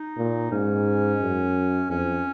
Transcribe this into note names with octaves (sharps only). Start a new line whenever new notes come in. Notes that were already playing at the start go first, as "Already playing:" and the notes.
Already playing: D#4
A#2
G#2 C#4
F#2
F2 C#4